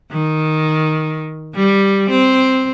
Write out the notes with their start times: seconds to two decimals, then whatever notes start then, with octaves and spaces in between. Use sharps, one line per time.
0.12 D#3
1.55 G3
2.10 C4